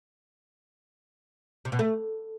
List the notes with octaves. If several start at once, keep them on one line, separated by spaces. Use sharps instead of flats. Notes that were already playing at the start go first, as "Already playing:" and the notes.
C3
B2
A3